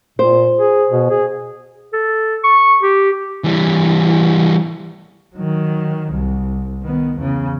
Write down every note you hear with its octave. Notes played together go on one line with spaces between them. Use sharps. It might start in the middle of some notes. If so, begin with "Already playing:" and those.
A#2 C5
G#4
B2
G#4
A4
C#6
G4
E3 G3
D#3 F#3
C2
D#3 B3
E2 C#3